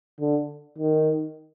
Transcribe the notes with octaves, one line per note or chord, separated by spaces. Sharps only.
D3
D#3